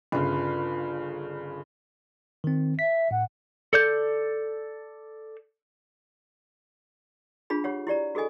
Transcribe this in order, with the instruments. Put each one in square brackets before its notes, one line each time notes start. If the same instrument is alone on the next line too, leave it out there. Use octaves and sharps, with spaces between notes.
[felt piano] G1 C#3 [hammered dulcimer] F4 B4
[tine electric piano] D#3 C4
[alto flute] E5 [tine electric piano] B6
[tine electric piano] A2 [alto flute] F#5
[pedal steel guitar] A4 D5 G6
[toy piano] D4 F4 G#4 B5
G4 C#5 F#5
E4 G4 D5 A#5
F#4 G#4 A4 D#5 G#5